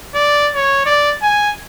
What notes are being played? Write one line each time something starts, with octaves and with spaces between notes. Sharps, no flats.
D5
C#5
D5
G#5